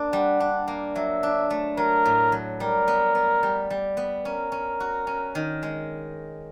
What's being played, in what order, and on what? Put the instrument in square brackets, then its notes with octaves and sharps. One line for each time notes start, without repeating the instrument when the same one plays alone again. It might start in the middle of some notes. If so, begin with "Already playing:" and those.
Already playing: [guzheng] A#3 D4
[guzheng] G3 [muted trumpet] F#5
[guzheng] D4
A#3
[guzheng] F#3 [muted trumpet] E5
[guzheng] D4
A3
[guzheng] F#3 [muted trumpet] A#4
[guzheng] A2
F#3
[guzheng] G3 [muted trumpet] A#4
[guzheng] B3
B3
G3
G3
B3
[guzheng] C#4 [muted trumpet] A#4
[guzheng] C#4
F#4
C#4
D#3
G#3